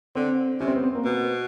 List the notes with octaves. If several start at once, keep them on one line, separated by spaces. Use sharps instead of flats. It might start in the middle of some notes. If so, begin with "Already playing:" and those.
D3 C4
C3 C#4
C4
B3
C4
A#3
B2 B3